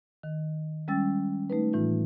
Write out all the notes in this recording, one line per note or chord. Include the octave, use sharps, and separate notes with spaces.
D#3
G3 G#3 C#4 G5 E6 A6
A3 D#4 B4
A2 E3 D#4 F4